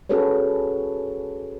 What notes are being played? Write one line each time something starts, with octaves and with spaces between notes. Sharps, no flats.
C#4 F#4 G#4 A4 B4 C#5